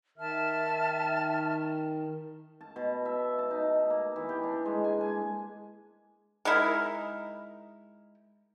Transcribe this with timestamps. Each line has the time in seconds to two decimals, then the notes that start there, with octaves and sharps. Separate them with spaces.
0.18 D#3 E5 A5 F6
2.61 A5
2.76 B2
3.05 E5
3.39 A5
3.51 D#4
3.90 A#3
4.16 E3
4.29 G4
4.43 D4
4.66 G#3
4.84 G#5
5.01 G#5
6.45 G#3 D#4 E4 A#4